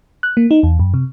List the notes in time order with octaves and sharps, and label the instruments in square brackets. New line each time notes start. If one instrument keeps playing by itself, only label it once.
[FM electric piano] F#6
A#3
D#4
E2
F#2
C3